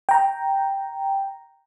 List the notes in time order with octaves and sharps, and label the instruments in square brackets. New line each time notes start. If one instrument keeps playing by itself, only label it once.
[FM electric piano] G5 A#5